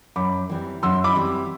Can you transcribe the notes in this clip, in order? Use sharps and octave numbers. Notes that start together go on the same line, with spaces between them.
F#2 B5 D6
E3 G3 C4
F#2 C6 E6
B5 D6
E3 G3 C4